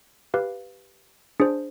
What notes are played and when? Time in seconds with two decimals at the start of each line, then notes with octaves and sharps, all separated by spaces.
0.34 G4 B4 F5
1.40 D4 G#4 C5